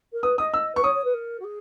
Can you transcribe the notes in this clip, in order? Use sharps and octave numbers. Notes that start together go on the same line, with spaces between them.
A#4
B4 D#6
D#5 D#6
E6
B4 C#6
C#5 D#6
C#5
B4
A#4
F#4
G#4